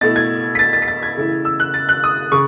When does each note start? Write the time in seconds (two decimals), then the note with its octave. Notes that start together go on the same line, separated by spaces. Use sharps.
0.01 B2 A3 E4 A6
0.16 G#6
0.55 B6
0.59 A6
0.73 A6
0.82 B6
0.88 A6
1.03 G#6
1.17 C#3 E3 A3 E4
1.45 E6
1.60 F#6
1.74 A6
1.89 F#6
2.04 D#6
2.32 C#3 C#6